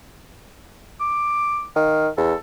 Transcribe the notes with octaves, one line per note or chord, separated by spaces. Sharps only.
D6
D#3 F5
E2 A4